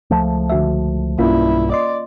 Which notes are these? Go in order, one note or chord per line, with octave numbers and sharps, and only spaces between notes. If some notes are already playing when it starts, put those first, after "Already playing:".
C#2 F3 A3
D3 F#4 E5
B1 G2 A#3 C#4 E4 F4
D5 D#5 C6